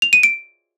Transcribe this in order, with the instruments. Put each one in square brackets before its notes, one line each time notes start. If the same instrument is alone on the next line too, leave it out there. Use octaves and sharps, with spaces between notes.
[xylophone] F7
D#7
D7